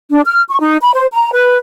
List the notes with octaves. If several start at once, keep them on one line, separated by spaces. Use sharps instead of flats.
D4
F6
C#6
D#4
B5
C5
A#5
B4